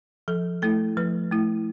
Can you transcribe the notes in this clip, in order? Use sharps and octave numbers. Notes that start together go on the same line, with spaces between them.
F3 A4
A3 E4 A4
F3 B4
A3 E4